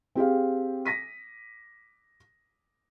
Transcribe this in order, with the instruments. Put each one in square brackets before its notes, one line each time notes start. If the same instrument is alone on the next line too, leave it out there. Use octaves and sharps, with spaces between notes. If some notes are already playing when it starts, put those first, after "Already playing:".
[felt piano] C4 G4 G#4 F5
A#6 B6 D#7